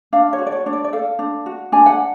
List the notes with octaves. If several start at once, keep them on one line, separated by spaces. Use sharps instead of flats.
D4 F5
C#5
F#4
D5
C#5
D4 C#5
D5
D5
A4 F5
D4
F#4
D4 G#5
F#5